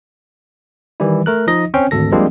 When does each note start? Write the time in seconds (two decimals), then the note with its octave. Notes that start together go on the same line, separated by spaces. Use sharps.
1.00 D#3 E3 G3 E4
1.26 A3 A#4 F#6
1.47 F3 D#4 D#5 A#6
1.74 C4 C#4 C5 G5
1.91 G#1 D2 A4 A#6
2.12 F3 G3 G#3 A#3 C4 D4